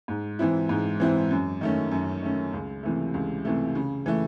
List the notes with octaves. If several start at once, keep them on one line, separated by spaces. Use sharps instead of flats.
G#2
E3 C4 E4
G#2
E3 C4 E4
F#2
D#3 A3 C#4
F#2
D#3 A3 C#4
C#2
C3 E3 A3
C#2
C3 E3 A3
C#3
E3 A3